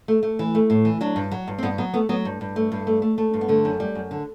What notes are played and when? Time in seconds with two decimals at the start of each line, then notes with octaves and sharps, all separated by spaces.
0.08 A3
0.23 A3
0.39 E3
0.55 A3
0.70 A2
0.85 E3
1.01 F#3 D4
1.16 G2
1.31 F#3
1.47 G2
1.58 C4
1.63 G2 B3
1.78 F#3 B3
1.94 A3 B3
2.09 F#3 B3
2.25 G2
2.41 G2
2.56 A3
2.72 G2
2.87 A3
3.02 A3
3.18 A3
3.34 G2
3.41 B3
3.48 D3 A3
3.65 F#2
3.80 G3
3.95 F#2
4.11 D3